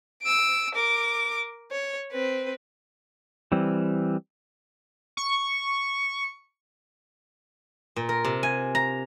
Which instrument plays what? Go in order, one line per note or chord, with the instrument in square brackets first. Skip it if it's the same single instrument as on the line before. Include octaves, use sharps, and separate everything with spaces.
[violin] E6 D7
A#4 D6
C#5
C4 B4
[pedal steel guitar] E3 G3 C4
[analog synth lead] C#6
[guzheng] A#2
A#4
C3
G#5
A#5